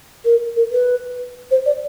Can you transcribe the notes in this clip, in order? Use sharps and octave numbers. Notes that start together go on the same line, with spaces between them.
A#4
A#4
B4
C5
D5